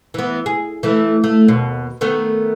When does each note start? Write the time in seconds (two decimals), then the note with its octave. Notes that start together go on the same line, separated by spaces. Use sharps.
0.14 E3 B3
0.46 G#4
0.83 E3 A3
1.24 A3
1.48 D#2 B2
2.01 D#3 A3 B3